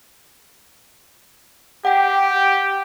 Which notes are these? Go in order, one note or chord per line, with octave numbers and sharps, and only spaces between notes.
G4 F#5 G5